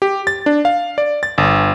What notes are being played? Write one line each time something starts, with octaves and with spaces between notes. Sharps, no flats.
G4
A6
D4
F5
D5
A6
G1